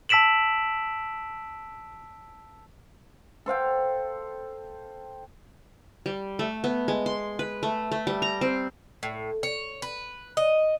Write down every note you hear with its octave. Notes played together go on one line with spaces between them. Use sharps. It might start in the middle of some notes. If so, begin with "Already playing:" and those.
A5 E6 B6 D7 E7 F#7
A4 C5 F5 G5
G3
A3
B3
G#3
C6
B4
A3
A3
G3
A#5
C4
A2
C#5
B4
D#5